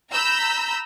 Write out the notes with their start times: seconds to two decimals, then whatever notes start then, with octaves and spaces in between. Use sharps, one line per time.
0.12 A#5 B5 E6 G6